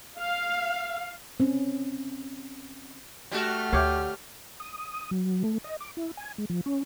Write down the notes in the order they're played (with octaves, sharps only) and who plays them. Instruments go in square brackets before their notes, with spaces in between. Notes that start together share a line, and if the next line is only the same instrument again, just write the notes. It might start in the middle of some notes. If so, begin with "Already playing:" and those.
[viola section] F5
[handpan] C4 C#4
[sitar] G3 F#4 [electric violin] A3 F6
[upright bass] D2 [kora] G4 C#5 F5
[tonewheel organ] D#6
D#6
F#3
A3
D#5
D6
E4
G#5
G#3
F3
C#4